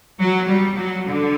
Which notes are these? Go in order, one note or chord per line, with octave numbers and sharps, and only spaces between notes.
F#3
G3
F#3
D3